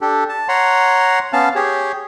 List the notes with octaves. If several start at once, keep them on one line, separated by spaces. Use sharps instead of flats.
D4 G4 A4
A5
C#5 F#5 A#5 C6
B3 C#4 F5 A5
G4 G#4 C#5